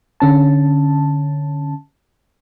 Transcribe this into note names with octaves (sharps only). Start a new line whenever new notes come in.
D3 C#4 A5